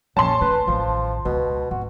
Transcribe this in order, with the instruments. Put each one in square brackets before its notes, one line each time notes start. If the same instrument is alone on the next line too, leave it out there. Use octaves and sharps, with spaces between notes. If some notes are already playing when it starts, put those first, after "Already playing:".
[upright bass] A#1 F2 [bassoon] C#4 [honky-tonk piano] A5 C6
[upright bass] C#3 A3 [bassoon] B4
[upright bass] A1 D#3 [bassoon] F3
[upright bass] C#2 [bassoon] B2
[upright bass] G#1 [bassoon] F#4